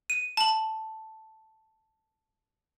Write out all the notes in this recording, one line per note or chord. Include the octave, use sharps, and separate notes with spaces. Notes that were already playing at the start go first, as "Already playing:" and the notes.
D#7
A5 F#7